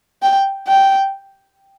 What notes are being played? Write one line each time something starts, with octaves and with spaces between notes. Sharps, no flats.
G5
G5